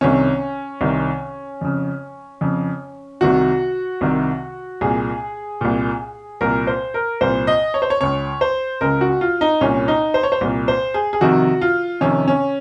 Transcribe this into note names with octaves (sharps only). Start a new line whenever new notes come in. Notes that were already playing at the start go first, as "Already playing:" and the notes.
C2 C3 D#3 C#4
C2 C3 D#3
F2 C#3
F2 C#3
C2 C3 D#3 F#4
C2 C3 D#3
C2 A#2 G#4
C2 A#2
C2 A#2 A#4
C5
A#4
C2 A#2 C5
D#5
C#5
C5
C#5
C#2 C#3 C#5
C5
C#2 C#3 A#4
F#4
F4
D#4
C2 A#2 C#4
D#4
C5
C#5
C5
C2 A#2
C5
G#4
G#4
F2 C3 D#3 F#4
F4
F2 C3 D#3 C#4
C#4